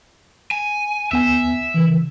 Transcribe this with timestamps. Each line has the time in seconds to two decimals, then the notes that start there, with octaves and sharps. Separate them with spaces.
0.51 G#5
1.12 D2 B3 E5 G#5
1.74 C#3 E3